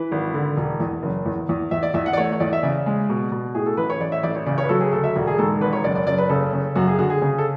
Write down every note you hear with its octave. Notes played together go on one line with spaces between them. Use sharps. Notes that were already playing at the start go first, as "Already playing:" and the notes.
Already playing: E3 B4
G#1
D3
E1
E2
F#1
E2
E2
E2 E5
D5
E2 E5
F#5
D5
A3 C#5
C#5
E2 D5
E5
C#3 D5
G#3
B2
B2
A2 G#4
A4
A1 B4
C#5
A1 D5
E5
A1 D5
C#5
C#3 D5
C#5
B4
F#3 A4
G#4
D2 A4
E5
E1 F#4
G#4
G#2 A4
G#1 B4
C#5
F#1 D5
D5
F#1 D5
B4
C#3 A4
C#3
F#2 F#4
G#4
D3 F#4
G#4
C#3 G#4
A4